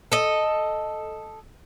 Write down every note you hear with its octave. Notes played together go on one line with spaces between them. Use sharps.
A4 D#5